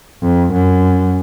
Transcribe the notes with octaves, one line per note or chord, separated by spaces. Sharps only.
F2
F#2